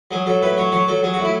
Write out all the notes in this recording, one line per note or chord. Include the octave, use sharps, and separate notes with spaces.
F#3 G#4
F#3 A4
A2 B4
F#3 C#5
F#3 C#5
F#3 A4
F#3 G#4
F#4
A2
E4